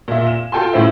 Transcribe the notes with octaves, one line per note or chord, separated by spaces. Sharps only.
A#2 E5
E7
F4 F#4 A4 G5 G#5 C6
A2 C#4 C5 E5